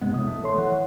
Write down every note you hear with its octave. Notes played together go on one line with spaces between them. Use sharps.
G2 C3 G#3 B3
E1 A1 A2 D#6
A3
A4 C#5 C6
E3 C#5 F#5